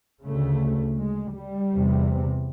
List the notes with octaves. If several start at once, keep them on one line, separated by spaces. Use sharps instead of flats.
D2 C#3 A3
G#3
G3
E2 C3